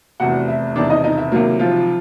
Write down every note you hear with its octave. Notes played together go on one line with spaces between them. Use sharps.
F1 E2 C3 F#4 F#5
E4 E5
E1 E2 C3 D#3 D4 D5
D#4 D#5
D#4 D#5
E4 E5
C#2 C3 D#3 F#3 A#3 A#4
F3 F4